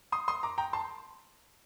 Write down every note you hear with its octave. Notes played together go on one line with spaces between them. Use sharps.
C6 D#6
C6 D#6
A#5 D6
G5 A#5
A5 C6